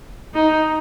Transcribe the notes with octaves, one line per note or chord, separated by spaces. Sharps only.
D#4